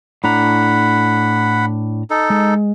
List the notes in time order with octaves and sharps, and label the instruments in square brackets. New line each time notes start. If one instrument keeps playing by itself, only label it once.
[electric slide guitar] A2 D4 A#5 [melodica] F#5 B5
[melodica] D#4 A4
[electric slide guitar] G#3